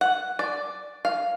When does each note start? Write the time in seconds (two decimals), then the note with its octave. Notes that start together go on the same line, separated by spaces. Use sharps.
0.01 F#5
0.39 D5
1.05 F5